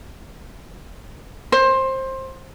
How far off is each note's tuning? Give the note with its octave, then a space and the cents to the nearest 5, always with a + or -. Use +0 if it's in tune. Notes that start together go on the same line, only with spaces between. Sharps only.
C5 +20